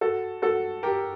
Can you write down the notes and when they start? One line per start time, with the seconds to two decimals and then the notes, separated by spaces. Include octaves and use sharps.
0.01 F#4 A4
0.42 F#4 A4
0.83 G4 A#4